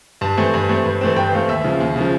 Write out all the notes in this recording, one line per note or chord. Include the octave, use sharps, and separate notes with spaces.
G2 A5
E3 A3 C4 G#5
G2
E3 A3 C4
G2
E3 A3 C4
G2 G5
E3 A3 C4 F5
D#2 E5
C#3 F3
D#2
C#3 F3